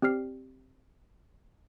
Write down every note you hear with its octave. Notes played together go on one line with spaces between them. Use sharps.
C4 G4 D5 F6 C7